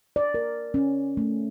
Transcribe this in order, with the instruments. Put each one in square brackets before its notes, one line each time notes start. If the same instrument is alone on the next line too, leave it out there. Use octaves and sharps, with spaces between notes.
[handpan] D5
A#4
C#4
A3